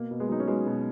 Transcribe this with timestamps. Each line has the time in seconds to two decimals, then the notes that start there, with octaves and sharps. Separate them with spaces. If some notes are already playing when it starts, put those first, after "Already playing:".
Already playing: B2 A#3
0.11 B2
0.20 G#3 B3
0.29 F#3 D#4
0.40 C#4
0.48 F#3 G#3 B3
0.67 B2